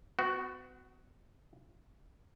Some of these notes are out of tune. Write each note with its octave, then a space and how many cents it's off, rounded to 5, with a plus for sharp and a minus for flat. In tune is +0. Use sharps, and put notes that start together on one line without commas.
B3 +45 F#4 +0